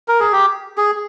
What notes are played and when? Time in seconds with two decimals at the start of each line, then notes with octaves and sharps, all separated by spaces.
0.08 A#4
0.20 G#4
0.32 G4
0.78 G#4